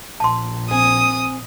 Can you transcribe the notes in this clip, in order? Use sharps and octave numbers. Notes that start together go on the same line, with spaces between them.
A#1 A5 C6
C4 G#5 D#6